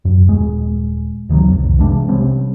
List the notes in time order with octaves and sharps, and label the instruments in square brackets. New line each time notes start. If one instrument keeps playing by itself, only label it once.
[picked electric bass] F#2
D#1 G#3
D2 D#3 E3 F#3
C2 F2
C3 E3 G#3 D4
C3 G3 C4 C#4